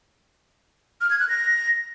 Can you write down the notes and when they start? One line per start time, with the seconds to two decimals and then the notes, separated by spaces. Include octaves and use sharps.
1.01 F6
1.10 G#6
1.20 F#6
1.29 A#6